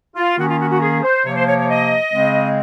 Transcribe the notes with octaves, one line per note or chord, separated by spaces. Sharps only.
F4
D#3 A#3 C#4 F#4
F4
F#4
F#4
G#4
C5
C3 F3 A#3 C#5
C5
C#5
C#5
D#5
C#3 G#3 C4